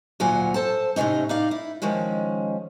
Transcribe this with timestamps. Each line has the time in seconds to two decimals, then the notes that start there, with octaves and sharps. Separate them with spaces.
0.20 D2 A#2 F#3 F4 F#5 G#5
0.54 A4 C5 A5
0.96 A2 C3 E3 C#4 D#4
1.29 D#4 D5 F5
1.51 E4
1.82 D#3 F3 G#3 C#4